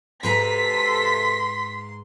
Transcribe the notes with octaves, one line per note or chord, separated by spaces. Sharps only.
G#2 C3 A4 B4 A#5 C6 B6